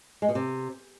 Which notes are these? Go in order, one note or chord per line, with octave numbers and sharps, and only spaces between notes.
G#3
B2
C3